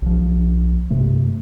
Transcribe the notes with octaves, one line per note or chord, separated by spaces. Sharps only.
B1 F3
G2 C3 A3